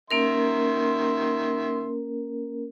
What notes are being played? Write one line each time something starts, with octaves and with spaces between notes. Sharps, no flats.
D#3 A#3 C#4 A#4 E5 C6